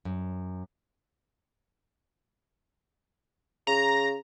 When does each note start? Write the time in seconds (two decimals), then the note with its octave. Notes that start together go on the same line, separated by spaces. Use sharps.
0.05 F#2
3.67 C#3 A#5